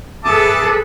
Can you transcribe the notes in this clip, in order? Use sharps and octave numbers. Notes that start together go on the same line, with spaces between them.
G#4 A4 B4 E5 A5 D6 D#6